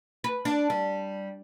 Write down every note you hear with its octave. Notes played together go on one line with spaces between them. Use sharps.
B4
D4
G3